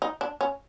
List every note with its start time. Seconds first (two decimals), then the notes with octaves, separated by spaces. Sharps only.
0.02 D#4
0.21 D4
0.41 C#4